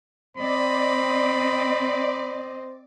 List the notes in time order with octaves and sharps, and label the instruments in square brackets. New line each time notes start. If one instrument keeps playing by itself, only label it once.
[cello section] C4 D#5 [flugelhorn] C5 [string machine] D5 [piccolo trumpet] B5